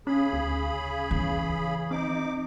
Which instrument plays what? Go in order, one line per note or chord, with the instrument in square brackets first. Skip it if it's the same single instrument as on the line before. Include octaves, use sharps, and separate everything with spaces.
[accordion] C#3 G#4 B5 [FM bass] C#4
[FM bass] D2
[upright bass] E3
[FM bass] C4 [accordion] D#4 D6